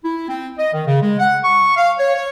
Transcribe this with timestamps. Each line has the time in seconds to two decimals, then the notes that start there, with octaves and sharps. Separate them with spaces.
0.04 E4
0.29 C4
0.58 D#5
0.73 D#3
0.86 C#3
1.02 G#3
1.19 F#5
1.44 C#6
1.77 F5
1.98 C#5
2.15 C#5